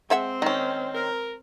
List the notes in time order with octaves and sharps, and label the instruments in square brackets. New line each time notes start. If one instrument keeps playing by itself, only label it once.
[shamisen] G#3 E5 F#5 [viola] C4
[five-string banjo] D#3 C#4
[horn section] A#4